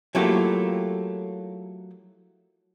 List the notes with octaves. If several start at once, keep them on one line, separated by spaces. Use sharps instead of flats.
F#3 A3 A#3 E4 F4 G4